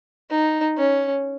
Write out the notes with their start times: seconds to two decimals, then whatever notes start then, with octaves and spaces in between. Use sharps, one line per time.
0.30 D#4
0.78 C#4